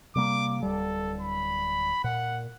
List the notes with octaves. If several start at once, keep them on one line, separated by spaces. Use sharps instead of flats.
C3 G3 A#3 D6
D1 G3 A4
B5
A#2 F#5